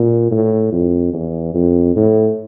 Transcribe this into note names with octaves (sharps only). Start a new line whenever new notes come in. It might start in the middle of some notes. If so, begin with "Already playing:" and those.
Already playing: A#2
A2
F2
E2
F2
A2